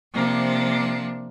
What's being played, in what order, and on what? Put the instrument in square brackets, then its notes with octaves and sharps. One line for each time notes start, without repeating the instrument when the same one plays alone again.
[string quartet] C3 F3 A#3 D4